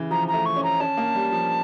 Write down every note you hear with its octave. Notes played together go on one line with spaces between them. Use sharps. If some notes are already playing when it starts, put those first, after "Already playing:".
Already playing: C#3 E3
F3 A#5
A#5
A3
C#6
C#4
A#5
C#4 A5
A#3
G3
F3